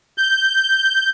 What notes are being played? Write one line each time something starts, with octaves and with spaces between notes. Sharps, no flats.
G6